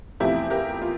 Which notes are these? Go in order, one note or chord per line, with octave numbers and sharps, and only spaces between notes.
E2 C3 F3 A3 E4 G4
G4 A#4
F4